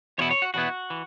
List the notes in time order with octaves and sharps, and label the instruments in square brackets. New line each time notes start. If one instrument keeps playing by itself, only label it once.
[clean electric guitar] E2 B2 B3 E4 C#5
C#5
F#4
E2 B2 B3 E4 F#4
E3